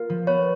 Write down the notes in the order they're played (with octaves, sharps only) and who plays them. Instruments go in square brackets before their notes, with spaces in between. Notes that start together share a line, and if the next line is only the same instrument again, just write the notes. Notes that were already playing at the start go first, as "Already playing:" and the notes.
Already playing: [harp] A#3 F4 A#4
F3
[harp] B3 [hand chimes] C#5